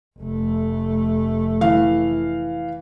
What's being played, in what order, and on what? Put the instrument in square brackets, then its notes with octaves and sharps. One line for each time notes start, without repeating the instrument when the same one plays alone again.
[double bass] F1 A3
[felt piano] E3 F5